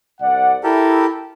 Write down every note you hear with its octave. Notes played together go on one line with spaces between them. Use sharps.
C2 D5 F#5
E4 G4 A4 A#4